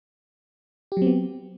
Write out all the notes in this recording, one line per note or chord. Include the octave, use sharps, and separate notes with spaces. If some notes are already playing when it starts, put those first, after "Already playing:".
F#3 B3 C4 G4